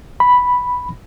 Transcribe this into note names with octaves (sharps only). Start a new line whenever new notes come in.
B5